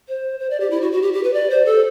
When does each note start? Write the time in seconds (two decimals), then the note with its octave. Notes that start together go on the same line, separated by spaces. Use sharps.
0.08 C5
0.40 C5
0.50 D5
0.60 G4
0.70 E4
0.81 F#4
0.92 F#4
1.02 G4
1.13 G4
1.24 B4
1.34 D5
1.50 C5
1.66 A4